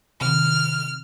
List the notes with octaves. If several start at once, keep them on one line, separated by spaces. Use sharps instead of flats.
C3 D#3 F6